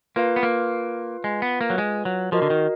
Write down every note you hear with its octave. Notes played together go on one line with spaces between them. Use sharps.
A#3 F4 B4 F5
B3
A#3
G#3
B3
A#3
F#3
G#3
F#3
F3 F#4 A#4 D#5
D3
D#3